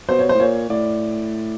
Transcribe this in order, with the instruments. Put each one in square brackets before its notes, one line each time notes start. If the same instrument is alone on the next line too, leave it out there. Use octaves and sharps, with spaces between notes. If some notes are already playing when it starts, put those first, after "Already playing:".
[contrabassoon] B2 [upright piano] C5
[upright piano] C#5
C5
[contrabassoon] A2
[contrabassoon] A#2 [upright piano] C#5
[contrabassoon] A2 [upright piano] D5